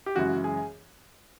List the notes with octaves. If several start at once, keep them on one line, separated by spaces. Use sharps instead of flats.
G4
F#2 C#3 E3 G#3 F#4
G#4